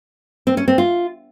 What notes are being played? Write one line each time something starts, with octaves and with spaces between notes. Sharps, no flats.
C4
C#4
C4
F4